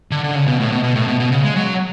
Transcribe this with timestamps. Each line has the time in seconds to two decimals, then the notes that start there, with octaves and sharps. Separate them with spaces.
0.11 D3
0.24 D3
0.35 C#3
0.48 B2
0.59 A2
0.72 B2
0.83 B2
0.96 A2
1.08 B2
1.20 B2
1.32 C#3
1.44 G#3
1.56 F#3